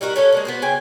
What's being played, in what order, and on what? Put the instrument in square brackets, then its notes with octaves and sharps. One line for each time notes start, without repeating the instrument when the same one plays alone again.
[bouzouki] G3 D#4 F#4 A#4
C#4 A4 C#5
G#3 A#3 D4
B3 F#4 C5
C#3 G5 G#5